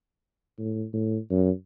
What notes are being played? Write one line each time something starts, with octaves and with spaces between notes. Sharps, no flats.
A2
A2
F#2